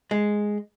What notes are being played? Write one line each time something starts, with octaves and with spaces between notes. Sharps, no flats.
G#3